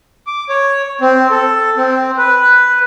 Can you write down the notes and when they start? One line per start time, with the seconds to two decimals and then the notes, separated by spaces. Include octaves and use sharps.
0.27 D6
0.49 C#5
1.01 C4
1.31 A4
1.77 C4
2.17 B4